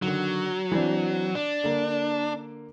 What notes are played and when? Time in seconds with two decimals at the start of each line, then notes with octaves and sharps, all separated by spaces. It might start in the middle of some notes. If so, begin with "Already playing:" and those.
0.02 D3 D#3 F#3
0.72 E3 C4 D4
1.35 D4
1.64 D3 A#3